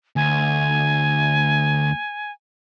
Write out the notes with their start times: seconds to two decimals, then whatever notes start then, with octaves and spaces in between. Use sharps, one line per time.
0.16 D2 G#5